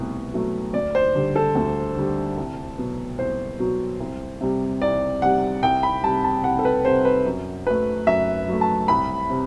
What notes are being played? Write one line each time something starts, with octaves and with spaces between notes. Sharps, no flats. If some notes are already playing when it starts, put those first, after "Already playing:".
Already playing: C2 B2 A3
B2 F#3 A3
D2 D5
C5
D3 G3
A4
D2
D3 G3
C2
B2 F#3
C2 C5
B2 F#3
C2
C3 G3
C2 D5
C3 G3 F#5
C2 G5
B5
C3 G3 A5
A5
C2 F#5
A4
B4
C3 G3 C5
B4
F#2
F#3 A3 B4
F#2 E5
F#3 A3
A5
C2 B5
C3